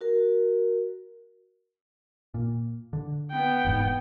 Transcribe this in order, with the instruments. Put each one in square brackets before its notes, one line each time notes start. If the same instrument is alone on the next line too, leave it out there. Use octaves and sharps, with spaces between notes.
[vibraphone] F#4 A#4
[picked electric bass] A#2
D3
[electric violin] B3 G5
[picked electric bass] E1 G#2